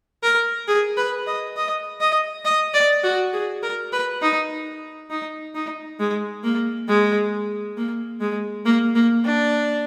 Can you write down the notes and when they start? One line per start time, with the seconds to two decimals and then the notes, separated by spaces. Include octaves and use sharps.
0.23 A#4
0.68 G#4
0.97 B4
1.27 D#5
1.57 D#5
2.00 D#5
2.45 D#5
2.74 D5
3.03 F#4
3.33 G#4
3.62 A#4
3.92 B4
4.22 D#4
5.10 D#4
5.55 D#4
5.99 G#3
6.44 A#3
6.88 G#3
7.77 A#3
8.21 G#3
8.65 A#3
8.95 A#3
9.24 D4